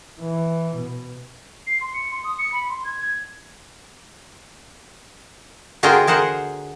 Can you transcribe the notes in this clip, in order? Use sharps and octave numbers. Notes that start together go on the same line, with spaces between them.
E3
B2
C7
C6
C#7
C6
D#6
C#7
B5
C6
G#6
G#6
D3 F4 F#4 G#4 A#4 G5
G#4 A#4 C5 F#5